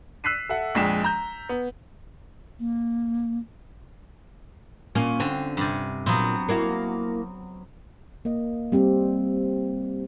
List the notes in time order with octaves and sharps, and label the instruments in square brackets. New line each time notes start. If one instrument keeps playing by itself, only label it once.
[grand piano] E6 F#6 B6 C7 D#7
A4 E5 F#5
A#1 F2 G#3 B6 E7
A#5 G6
B3
[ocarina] A#3
[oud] A#2 A#3 [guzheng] C#4
[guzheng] D3 [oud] C4
[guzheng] G2 C3
[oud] A#2 [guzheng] F#3 B3 C4
[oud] A#3 E4 F#4
[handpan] A#3 D#5
G3 C4 G4